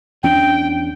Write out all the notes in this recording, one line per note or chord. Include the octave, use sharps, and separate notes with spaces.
E2 C#4 D4 G5